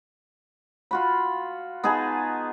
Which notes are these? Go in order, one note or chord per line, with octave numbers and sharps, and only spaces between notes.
F4 F#4 B5
B3 D#4 G#4 A5